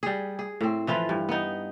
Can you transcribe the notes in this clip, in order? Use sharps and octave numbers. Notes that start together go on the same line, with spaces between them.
G3 G#4
G#4
A2 C4
E3 F3 F4 B4
G2
B3 D#4